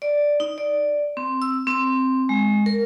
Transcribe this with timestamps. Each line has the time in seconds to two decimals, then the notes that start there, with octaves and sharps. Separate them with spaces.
0.02 D5
0.40 D#4
0.58 D5
1.17 C4
1.42 E6
1.67 C4
2.29 G#3
2.66 A#4